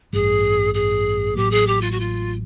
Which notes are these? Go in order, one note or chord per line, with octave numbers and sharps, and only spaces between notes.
A1 G2 E3 G3 G#4
G#4
A1 A2 F#3 A#3 G4
G#4
G4
F4
F#4
F4